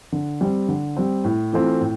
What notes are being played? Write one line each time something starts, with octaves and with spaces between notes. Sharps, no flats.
D3
G3 C4
D3
G3 C4
A2
E3 A3 C4 F4
A2